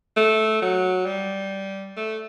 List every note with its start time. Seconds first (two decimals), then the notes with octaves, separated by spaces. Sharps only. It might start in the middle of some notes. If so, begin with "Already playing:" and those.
0.17 A3
0.62 F#3
1.06 G3
1.97 A3